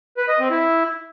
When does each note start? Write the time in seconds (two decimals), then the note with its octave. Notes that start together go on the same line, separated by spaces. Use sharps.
0.17 B4
0.28 D#5
0.40 C4
0.51 E4